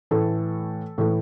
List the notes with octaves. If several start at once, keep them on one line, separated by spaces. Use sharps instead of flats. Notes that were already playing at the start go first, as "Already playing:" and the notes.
A2 E3 A3 A4
A2 E3 A3